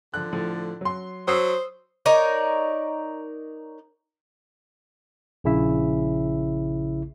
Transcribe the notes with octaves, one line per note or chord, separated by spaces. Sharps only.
D3 F3 F#6
A2 F3
F#3 C6
F#3 C5 D#6 E6 C7
D#4 A#4 C#5 D5
A#1 C#3 E4 E5